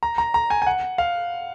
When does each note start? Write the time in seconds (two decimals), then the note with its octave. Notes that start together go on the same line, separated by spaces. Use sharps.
0.03 A#5
0.18 A#5
0.34 A#5
0.50 G#5
0.62 G#5
0.67 F#5
0.98 F5